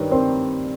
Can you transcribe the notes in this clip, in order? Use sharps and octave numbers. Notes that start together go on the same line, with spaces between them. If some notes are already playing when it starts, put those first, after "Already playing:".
Already playing: G2 D#3 G3 B4 C#5
C4 A#4 C5